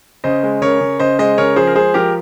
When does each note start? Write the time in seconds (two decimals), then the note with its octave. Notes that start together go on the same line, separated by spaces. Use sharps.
0.24 C#3 C5 D#5
0.43 G#3
0.62 C#3 A#4 C#5
0.81 C#3
0.99 C#3 C5 D#5
1.19 G#3 C5 D#5
1.38 C#3 A#4 C#5
1.56 F3 G#4 C5
1.67 A#4
1.75 G#3 G#4 C5
1.94 F3 G4 A#4